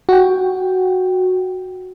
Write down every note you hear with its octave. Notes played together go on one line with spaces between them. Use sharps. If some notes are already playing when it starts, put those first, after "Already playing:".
F#4 G5